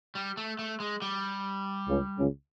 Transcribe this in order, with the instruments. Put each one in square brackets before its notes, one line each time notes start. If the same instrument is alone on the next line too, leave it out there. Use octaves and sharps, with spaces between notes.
[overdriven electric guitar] G3
A3
A3
G#3
G3
[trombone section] C#2 C#3
C#2 C#3